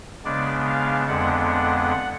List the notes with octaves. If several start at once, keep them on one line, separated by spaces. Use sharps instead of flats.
C#3 G#3 B3 D4 D5
F5
F2 D3 G#3 B3 D4 F#5
F#5